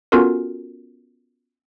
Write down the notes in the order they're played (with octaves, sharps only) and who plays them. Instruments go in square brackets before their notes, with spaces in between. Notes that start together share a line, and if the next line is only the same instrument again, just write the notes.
[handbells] B3 C#4 F4 F#4 A4 A#4